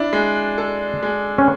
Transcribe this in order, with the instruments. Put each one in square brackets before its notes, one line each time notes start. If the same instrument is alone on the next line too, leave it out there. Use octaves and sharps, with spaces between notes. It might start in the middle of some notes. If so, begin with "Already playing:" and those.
Already playing: [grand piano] D4 [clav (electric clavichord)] E4
[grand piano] G#3
A4
G#3
[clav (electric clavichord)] C#4